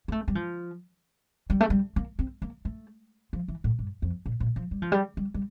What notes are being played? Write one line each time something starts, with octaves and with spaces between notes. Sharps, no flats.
A#3
A3
G3
F3
G3
A3
G3
A#3
C4
A#3
A3
F3
E3
A2
G2
F2
A#2
A#2
F3
G3
F3
G3
G3
G3